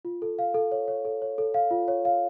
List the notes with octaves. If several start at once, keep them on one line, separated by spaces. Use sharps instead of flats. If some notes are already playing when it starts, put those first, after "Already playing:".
F4
A4
F5
A4
C#5
C#5
A4
C#5
A4
F5
F4
C#5
F5